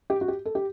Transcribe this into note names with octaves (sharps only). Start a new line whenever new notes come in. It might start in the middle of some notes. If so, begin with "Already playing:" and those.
G4
F#4
G4
A4
G4